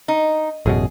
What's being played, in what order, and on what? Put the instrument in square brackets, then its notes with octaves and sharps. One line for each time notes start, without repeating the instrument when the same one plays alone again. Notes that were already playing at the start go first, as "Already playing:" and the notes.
[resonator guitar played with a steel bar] D#4
[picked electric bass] A1 F#2 B2 [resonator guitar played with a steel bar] G#4